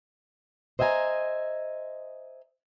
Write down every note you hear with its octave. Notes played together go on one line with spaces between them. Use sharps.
C5 D#5 E5 G5 G#5 A#5